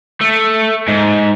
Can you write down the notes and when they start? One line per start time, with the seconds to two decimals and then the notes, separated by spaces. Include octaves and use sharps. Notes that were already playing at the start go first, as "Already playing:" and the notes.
0.21 A3
0.88 G#2